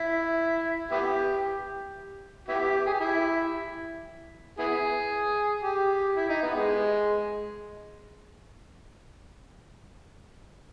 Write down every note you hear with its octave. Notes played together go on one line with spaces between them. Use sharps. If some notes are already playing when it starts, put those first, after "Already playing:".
Already playing: E4
B3 E4 G4
B3 E4 G4
G#4
G4
E4
B3 E4 G#4
G4
E4
D#4
B3
G#3